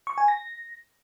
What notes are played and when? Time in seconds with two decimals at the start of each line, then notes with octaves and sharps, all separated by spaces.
0.07 C#6
0.18 G#5
0.28 A#6